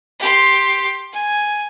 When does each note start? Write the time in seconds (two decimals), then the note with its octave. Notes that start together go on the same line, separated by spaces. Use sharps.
0.20 G4 C6
1.13 G#5